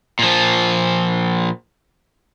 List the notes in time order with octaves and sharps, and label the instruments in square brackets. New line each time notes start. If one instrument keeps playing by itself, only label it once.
[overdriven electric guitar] A#2 F3